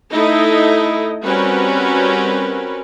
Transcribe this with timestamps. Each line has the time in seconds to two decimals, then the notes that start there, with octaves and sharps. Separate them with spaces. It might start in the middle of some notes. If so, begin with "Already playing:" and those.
0.11 A3 D#4 E4 A4 D#5
1.25 G3 C4 C#4 F#4 A#4 B4